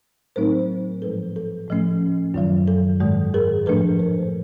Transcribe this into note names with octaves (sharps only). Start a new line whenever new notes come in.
A2 F#3 A3 C4 D#4 A#4 C5
G#2 F3 G#3 A4 B4
A4
A2 F3 A3 C#4
F#2 D#3 F#3
A4
G#2 D#3 G#3
G#4 A#4
A2 F3 A3 D4 A4 B4
A#4 C5